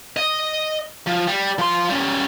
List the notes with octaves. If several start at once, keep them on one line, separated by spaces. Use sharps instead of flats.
D#5
F3
G3
F3 C6
G3 C#4